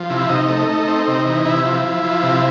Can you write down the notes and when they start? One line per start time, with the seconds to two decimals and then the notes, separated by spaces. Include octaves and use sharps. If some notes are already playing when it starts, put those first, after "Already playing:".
Already playing: F3
0.10 C3 E4
0.29 C3 D#4
0.49 A3
0.69 A3
0.87 C4
1.08 C3
1.26 E3
1.45 C3 E4
1.65 F3
1.85 F3
2.03 F3
2.23 C3